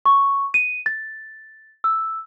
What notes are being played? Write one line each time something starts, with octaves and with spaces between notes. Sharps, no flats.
C#6
D#7
A6
E6